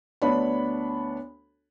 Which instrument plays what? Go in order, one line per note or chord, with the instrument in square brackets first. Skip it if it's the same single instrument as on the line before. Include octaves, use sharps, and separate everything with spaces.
[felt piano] D2 B3 D4 C#5 B5